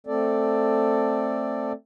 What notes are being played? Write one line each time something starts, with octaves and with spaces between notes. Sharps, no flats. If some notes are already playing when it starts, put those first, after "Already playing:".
A3 C4 A4 D5